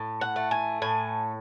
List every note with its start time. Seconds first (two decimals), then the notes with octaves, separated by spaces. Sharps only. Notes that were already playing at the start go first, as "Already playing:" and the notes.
Already playing: A2
0.21 F#5
0.36 A3
0.51 G#5
0.82 A2 G#5